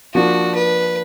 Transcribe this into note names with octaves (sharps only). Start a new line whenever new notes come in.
F3 A#3 D4 F4 F#4
B4